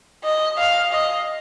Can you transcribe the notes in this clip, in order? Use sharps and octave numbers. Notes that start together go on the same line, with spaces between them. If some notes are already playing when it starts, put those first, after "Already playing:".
D#5
F5
D#5